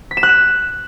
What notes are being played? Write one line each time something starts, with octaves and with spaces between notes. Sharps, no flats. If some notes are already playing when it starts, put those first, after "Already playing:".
B6
E7
F#6
E7